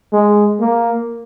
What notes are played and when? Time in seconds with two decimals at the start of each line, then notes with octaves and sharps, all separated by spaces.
0.13 G#3
0.60 A#3